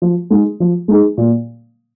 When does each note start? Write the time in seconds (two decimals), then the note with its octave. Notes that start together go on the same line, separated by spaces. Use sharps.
0.02 F3
0.30 G#3 D#4 G#4
0.60 F3
0.88 G#3 D#4 G#4
1.18 A#2